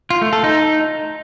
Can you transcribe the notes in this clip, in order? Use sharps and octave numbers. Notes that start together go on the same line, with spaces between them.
F4
A3
A4
D#4